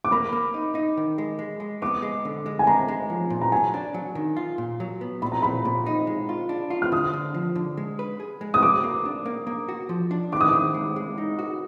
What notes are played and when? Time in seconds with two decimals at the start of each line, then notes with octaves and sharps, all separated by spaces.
0.04 D6
0.11 A#3 B5
0.33 A#3
0.54 D#4
0.75 D#4
0.97 D#3
1.18 G#3
1.39 G#3
1.60 G#3
1.82 B3 D6
2.02 G#3
2.25 D3
2.46 G#3
2.59 G#5
2.67 G#3 A#5
2.88 G#3
3.10 F3
3.30 A#2
3.41 A#5
3.52 F#3 G#5
3.74 D4
3.94 F#3
4.15 D#3
4.37 F4
4.58 A#2
4.80 F#3
5.01 B3
5.22 A#2 B5
5.32 A#5
5.42 A#2 B5
5.65 A#2
5.86 D#4
6.07 G#3
6.29 F4
6.49 D4
6.70 F4
6.82 F6
6.92 D3 D#6
7.13 D3
7.34 F3
7.55 D3
7.77 G#3
7.99 B4
8.20 G#4
8.41 G#3
8.54 D#6
8.62 F#4 D6
8.83 A#3
9.05 D4
9.26 A#3
9.47 A#3
9.69 F#4
9.89 F3
10.11 D4
10.32 D#3 D6
10.41 D#6
10.48 D#3 D6
10.74 G#3
10.96 G#3
11.18 D#4
11.39 F#4